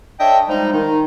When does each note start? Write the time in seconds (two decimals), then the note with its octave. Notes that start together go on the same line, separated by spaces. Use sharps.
0.19 D4 A4 C#5 D#5 E5 G5
0.48 F3 G3 G#3 D#4
0.73 D#3 D#4